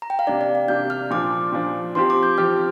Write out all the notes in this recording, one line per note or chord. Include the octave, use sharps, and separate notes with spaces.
A#5
G5
F5
C3 A#3 D4 D5
D5
F5
C3 A#3 D4 G6
F6
A#2 F3 D4 D6
A#2 F3 D4
F3 C4 G4 C6
D6
G6
F3 C4 G4 F6